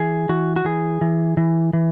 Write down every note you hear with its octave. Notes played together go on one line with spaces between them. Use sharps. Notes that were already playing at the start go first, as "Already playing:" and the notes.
Already playing: E3 G#4
E3 F#4
F#4
E3 G#4
E3
E3
E3